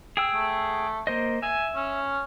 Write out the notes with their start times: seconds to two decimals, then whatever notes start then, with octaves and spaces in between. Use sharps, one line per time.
0.17 G#4 G5 E6
0.34 A3
1.07 A#3 C5 D#5
1.42 E5 G#5
1.75 C#4